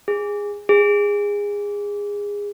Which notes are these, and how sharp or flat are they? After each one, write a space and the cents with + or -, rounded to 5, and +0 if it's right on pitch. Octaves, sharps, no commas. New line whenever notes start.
G#4 -15
G#4 -20